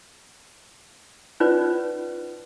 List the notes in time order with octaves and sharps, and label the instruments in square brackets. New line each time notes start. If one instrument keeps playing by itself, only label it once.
[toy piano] C#4 D#4 F4 B4 C5 D5